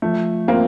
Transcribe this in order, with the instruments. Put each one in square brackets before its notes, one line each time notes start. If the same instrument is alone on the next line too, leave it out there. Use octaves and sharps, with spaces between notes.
[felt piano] F3 [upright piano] A3
[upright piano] A#3 [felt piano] C4 F4